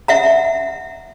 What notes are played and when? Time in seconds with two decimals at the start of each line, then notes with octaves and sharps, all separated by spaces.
0.08 E5 F#5 A#5